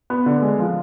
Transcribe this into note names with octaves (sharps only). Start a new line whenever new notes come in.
B3
D3
G#3
F3